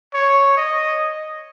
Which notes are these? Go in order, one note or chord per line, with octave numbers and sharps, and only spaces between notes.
C#5
D#5